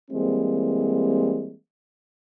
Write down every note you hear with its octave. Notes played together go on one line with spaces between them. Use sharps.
E3 G3 G#3 A#3 C4